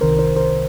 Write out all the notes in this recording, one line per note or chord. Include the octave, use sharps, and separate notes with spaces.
C2 C3 D#3 A#4 C5
A#4 C5
A#4 C5